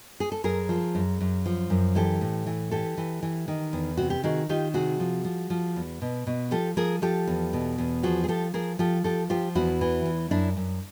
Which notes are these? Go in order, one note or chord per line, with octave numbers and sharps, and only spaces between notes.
G#4
A4
F#2 G#4 A#4
F3
F#2
F#2
F3
F#2
E3 G4 A4
A2
E3
E3 G4 A4
E3
E3
D#3
E2
C3 F#4
G4
D#3 F#4 G#4
D#3 F4 G4
C3 F#4 G#4
F3
F3
F3
E2
B2
B2
F3 G4 A4
F3 G#4 A#4
F3 G4 A4
E2
B2
E2
F3 F#4 G#4
G#4
F3 G4 A4
F3 G#4 A#4
F3 G4 A4
F3 G4 A4
F3 F4 G4
E2 E4 F#4
E3
E2
F#2 D4 E4
F#2